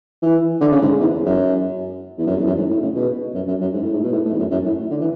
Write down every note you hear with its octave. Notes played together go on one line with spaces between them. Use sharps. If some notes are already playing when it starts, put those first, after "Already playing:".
E3
D3
C#3
G#2
E2
F#2
E2
F#2
E2
F#2
G#2
A2
C#3
B2
F#2
F#2
F#2
G#2
A2
G#2
B2
A2
A2
E2
F#2
F#2
A2
D3
E3